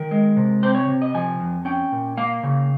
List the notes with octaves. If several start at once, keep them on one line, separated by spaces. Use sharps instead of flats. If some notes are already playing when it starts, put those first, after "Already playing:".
Already playing: D#3 A#4
G#3
C3
C4 C5
C#5
C3
D#5
F3 G#5
F2
C#4 G5
A#2
A#3 F5
C#3